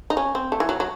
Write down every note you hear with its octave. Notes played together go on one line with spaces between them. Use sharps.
D#4
C#4
C4
A3
E3
F#3
F#3